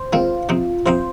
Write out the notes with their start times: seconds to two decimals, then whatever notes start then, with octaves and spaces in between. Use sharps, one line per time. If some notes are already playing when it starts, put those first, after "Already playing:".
Already playing: C5
0.13 D#3 G#3 C4 F4
0.49 C3 F3 C4 D#4
0.86 C3 F3 C4 D#4 C5